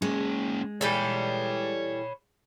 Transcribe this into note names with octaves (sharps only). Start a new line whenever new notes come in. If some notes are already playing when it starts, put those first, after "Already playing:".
G#3 A#3 C#4
E3 G3 A4 C#5 B5